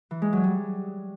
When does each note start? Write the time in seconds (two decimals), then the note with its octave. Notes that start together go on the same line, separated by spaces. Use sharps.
0.11 E3
0.22 G#3
0.33 F#3
0.44 G3